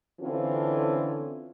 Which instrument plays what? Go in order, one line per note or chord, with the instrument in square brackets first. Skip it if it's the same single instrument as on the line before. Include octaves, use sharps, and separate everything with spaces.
[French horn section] D3 E3 C4 C#4 F4 A4